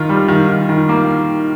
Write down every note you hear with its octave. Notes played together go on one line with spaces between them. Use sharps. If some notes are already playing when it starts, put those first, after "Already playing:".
Already playing: D#3 F4
G3
D#3
D#3
D#3
A#3